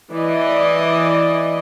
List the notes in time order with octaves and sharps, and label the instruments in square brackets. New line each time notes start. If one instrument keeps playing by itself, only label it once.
[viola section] E3 D5 D#5